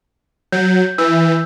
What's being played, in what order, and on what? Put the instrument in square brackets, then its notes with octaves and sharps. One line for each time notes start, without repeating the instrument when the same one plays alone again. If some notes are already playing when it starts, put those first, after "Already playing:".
[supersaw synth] F#3 [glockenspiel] G6
[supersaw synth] E3 [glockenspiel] E6